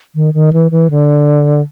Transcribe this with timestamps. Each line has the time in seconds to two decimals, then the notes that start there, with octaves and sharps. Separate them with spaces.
0.15 D#3
0.34 D#3
0.53 E3
0.71 E3
0.90 D3